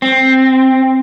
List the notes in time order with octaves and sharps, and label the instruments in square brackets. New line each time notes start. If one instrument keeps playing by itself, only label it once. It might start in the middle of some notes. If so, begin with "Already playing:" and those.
[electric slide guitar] C4